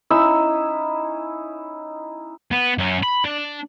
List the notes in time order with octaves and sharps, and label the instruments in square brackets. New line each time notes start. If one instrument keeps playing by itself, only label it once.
[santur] C#4 D#4 E4 E6
[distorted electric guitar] B3
F#2 C#4
B5
D4